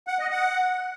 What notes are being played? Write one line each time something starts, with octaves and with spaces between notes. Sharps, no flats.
F#5
D#5
F#5